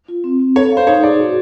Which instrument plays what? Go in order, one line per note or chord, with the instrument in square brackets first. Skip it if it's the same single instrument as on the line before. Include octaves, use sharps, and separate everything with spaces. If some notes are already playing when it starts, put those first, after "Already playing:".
[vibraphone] F4
C4
C4
[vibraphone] A4 [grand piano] C#5
[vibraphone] F5
[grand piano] C5
[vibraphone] D#4 [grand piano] C#5
[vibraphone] G#4 [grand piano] D5
[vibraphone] F#4